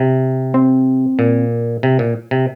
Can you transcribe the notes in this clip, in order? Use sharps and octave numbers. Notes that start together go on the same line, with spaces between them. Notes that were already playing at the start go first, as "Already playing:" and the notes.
Already playing: C3
C4
A#2
C3
A#2
C3